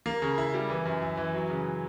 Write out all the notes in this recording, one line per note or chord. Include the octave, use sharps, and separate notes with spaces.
A#3
C#3
E4
G3
E3
F#2
E4
E3
F#3
C#3